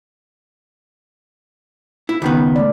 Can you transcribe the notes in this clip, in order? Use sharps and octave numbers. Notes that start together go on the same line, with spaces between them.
E4
C#2 D#3 B3
A3 D5